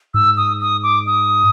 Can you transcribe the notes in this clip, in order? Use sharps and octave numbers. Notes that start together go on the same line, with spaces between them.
G#2 E6
D#6
D#6
D6
D#6